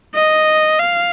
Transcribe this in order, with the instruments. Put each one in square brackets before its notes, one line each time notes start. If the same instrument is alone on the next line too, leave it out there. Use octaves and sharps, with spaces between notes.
[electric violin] D#5
F5